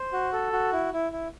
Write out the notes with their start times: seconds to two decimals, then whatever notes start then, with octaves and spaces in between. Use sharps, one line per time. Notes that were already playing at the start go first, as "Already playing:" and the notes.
Already playing: C5
0.13 F#4
0.33 A4
0.53 F#4
0.73 E4
0.93 E4
1.12 E4